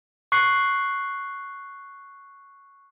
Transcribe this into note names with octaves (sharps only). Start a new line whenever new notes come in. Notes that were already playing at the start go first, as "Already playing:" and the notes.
C#6 F#6 C7